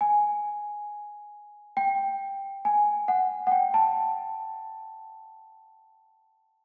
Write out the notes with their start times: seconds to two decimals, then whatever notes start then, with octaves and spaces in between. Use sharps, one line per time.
0.01 G#5
1.77 G5
2.65 G#5
3.08 F#5
3.47 F#5
3.52 G5
3.74 A5